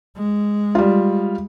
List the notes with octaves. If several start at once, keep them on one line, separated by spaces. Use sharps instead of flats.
G#3
G3 F4